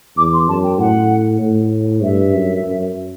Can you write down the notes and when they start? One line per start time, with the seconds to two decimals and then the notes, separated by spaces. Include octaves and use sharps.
0.17 E2 D6
0.33 C6
0.48 F#2 A5
0.64 G5
0.79 A2 F#5
1.41 A2
2.03 G2 E5
2.34 F#2
2.64 F#2